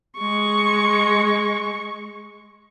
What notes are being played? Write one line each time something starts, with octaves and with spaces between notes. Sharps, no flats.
G#3 C#6